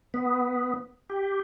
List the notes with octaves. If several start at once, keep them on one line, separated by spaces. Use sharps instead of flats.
B3
G4